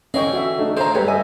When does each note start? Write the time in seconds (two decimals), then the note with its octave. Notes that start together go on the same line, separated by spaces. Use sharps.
0.14 D3 E3 C#4 G#4 C#5 D#5 G5
0.33 F#4 E5
0.59 A3 D4 D#4
0.77 D#2 A#2 C#3 C5 A#5
0.95 G2 G4 A4 B4 C#5
1.08 D#5 E5 G#5